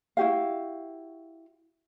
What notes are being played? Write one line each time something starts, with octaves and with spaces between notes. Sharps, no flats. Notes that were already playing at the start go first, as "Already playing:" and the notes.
E4 F#4 G4 F5